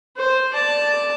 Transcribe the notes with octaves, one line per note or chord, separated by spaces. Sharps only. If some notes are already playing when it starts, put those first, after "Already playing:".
C5
D5 A5